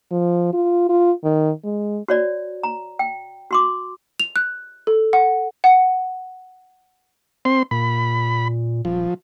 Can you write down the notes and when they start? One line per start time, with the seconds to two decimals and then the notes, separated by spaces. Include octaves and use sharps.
0.12 F3
0.53 F4
0.89 F4
1.24 D#3
1.64 G#3
2.08 F#4 C#5 D5
2.63 A#5
2.99 G5
3.51 F#4 C6 D6
4.20 F7
4.36 F#6
4.87 A4
5.13 F#5
5.64 F#5
7.45 C4 C6
7.71 A#2 B5
8.85 D#1 F3